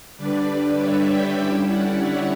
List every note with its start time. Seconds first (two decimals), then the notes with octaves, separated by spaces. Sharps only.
0.17 D3 G3 D4 B4 D5
0.77 C#5 E5
1.07 G5 B5
1.37 D3 G3 C#4 E4 C#5 E5
1.67 D5 F#5
1.97 C#5 E5